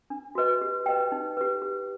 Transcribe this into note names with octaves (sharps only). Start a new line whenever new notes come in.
D4
F#4 B4 D#5
G4
B4 D#5 G5
D#4
G4 B4
G4